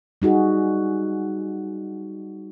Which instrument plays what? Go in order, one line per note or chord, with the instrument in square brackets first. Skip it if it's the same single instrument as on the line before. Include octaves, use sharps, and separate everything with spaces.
[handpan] G3 D#4 F#4 G#4